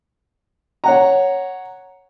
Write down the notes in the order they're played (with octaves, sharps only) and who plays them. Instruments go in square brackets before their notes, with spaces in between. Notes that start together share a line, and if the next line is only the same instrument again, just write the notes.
[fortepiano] C#5 F#5 A#5